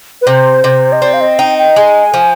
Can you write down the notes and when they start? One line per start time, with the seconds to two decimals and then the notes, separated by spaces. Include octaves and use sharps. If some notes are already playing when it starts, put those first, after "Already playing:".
0.22 B4
0.27 C3 C5
0.64 C3
0.92 D#5
1.02 C4 D5
1.13 F5
1.21 D#5
1.39 D#4 G5
1.58 G5
1.76 G#3 G#5
2.14 F3